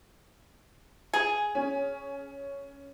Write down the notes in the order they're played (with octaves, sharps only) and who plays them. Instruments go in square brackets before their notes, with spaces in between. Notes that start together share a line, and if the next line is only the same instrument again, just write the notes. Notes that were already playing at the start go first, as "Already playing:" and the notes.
[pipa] G#4
[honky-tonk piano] C#4